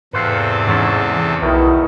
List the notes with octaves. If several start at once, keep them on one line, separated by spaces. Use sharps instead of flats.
E2 G#2 C3 A4 B4 C5 F5
G#2 E3 C#4 A5
B1 E2 B2 D#3 E4